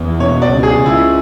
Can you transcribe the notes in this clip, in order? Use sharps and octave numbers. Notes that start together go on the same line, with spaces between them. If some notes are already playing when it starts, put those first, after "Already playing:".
Already playing: E2
B2 C#5
D5
C#2
G#4
C#2
E4